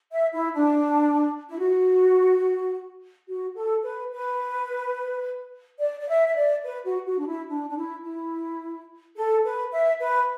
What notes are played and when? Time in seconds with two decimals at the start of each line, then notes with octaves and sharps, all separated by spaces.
0.12 E5
0.34 E4
0.54 D4
1.49 E4
1.59 F#4
3.27 F#4
3.55 A4
3.84 B4
4.12 B4
5.79 D5
6.00 D5
6.08 E5
6.28 E5
6.35 D5
6.64 B4
6.84 F#4
7.06 F#4
7.19 D4
7.27 E4
7.48 D4
7.69 D4
7.76 E4
8.04 E4
9.17 A4
9.45 B4
9.72 E5
10.00 B4